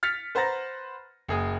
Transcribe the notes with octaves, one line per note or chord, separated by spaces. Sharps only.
F6 A6 B6 C#7 F7
B4 C5 F#5 A#5 A6 A#6
F#1 G#4 D#6